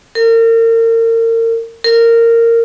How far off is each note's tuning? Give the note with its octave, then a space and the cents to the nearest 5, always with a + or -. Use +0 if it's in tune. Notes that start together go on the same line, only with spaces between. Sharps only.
A#4 -35
A#4 -15